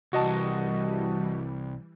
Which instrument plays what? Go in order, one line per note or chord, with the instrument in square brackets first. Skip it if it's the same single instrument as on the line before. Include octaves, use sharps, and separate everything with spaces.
[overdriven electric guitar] C2 [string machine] E3 G3 [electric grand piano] F#4 D#5 A5